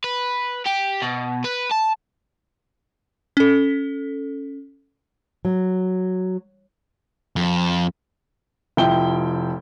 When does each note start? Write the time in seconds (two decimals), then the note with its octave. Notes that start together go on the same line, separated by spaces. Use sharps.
0.04 B4
0.66 G4
1.02 B2
1.44 B4
1.71 A5
3.37 C#4 A4
5.45 F#3
7.36 F2
8.77 F1 F3 E4 G5 G7